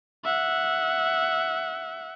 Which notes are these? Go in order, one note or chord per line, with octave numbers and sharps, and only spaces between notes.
E5 F#5